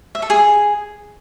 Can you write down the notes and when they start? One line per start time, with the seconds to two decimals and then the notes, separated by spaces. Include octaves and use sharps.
0.15 E5
0.22 A4
0.30 G#4